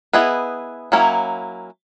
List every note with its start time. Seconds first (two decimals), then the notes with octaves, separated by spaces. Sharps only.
0.13 B3 E4 G#4 B4 D#5
0.92 F#3 A#3 C#4 E4